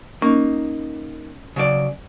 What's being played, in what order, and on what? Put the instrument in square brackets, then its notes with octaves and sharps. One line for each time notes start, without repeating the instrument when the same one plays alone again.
[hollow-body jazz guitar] A#3 D#4 [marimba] C#4
[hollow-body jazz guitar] C#3 F#3 D5